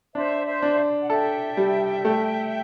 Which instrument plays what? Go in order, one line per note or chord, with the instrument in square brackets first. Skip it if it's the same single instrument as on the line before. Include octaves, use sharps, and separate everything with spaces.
[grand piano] D4 [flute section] C5 E5
[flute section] C5 E5
[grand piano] D4
[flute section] F#5
[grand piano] A4 [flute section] E5 G5
[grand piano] G3
A3